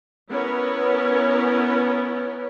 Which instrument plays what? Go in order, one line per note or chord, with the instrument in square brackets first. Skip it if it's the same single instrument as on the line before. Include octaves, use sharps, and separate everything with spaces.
[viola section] B3 C#4 E4 A#4 C#5